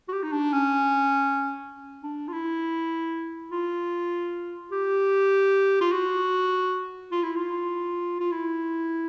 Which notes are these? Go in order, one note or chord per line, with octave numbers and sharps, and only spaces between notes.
F#4
G4
D#4
D4
C#4
D4
F4
E4
F4
G4
F4
F#4
F4
E4
F4
F4
E4